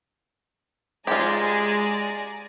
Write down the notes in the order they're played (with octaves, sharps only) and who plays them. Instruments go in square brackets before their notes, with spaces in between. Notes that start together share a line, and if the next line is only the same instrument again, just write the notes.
[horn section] G#3 [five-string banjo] F4 G4 [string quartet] D5 G#5 A#5